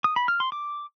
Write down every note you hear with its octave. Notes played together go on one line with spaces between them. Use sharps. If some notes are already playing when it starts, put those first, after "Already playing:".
D#6
B5
F6
C6
D6